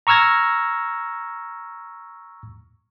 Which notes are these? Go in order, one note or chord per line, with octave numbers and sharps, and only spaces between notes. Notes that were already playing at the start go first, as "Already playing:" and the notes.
A#5 C#6 E6 F6 G#6 A#6